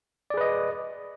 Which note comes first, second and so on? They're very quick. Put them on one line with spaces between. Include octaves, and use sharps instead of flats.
D5 G#4 B4 D#5